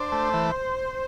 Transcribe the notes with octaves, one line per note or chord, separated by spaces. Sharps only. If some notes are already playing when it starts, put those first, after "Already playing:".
Already playing: D4 C5
A3
E3